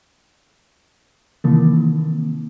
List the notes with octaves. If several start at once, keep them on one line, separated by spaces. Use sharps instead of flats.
C3 D#3 E3 A#3